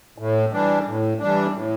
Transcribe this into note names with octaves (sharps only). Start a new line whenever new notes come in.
A2
E3 G3 D4
A2
E3 G3 D4
A2